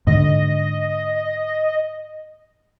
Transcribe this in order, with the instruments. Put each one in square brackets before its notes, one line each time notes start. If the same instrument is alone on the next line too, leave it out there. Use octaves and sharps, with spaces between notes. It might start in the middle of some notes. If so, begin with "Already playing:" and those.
[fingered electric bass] G#2 D3 [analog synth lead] D#5